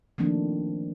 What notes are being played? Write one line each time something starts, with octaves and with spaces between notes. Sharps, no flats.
D#3 F3 A3 A#3 C4 D4